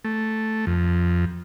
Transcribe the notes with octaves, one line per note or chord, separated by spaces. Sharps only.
A3
F2